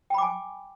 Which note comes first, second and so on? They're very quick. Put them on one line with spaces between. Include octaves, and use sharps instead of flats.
G5 B5 D6 G#5